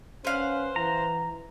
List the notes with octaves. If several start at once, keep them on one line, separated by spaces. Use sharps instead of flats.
C#4 B4 C5 F5 F#5
E3 A#5